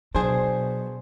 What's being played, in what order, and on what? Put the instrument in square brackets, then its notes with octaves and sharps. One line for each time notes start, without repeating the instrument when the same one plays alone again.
[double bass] B2 [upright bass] F#3 [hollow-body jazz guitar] D4 G#4 [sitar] C5